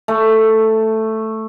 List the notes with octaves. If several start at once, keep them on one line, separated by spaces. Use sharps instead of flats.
A3